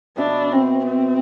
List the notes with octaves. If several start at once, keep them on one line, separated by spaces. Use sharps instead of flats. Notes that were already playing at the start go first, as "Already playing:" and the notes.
B2 B3 D4 E4
C4
C4